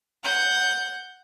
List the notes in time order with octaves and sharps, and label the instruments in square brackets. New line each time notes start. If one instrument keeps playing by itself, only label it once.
[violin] F#5 G6